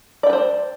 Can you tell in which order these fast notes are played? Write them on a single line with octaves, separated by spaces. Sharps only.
D5 G5 B4 C5